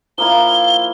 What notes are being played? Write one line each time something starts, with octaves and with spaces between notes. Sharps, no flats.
F3 A#3 E4 G7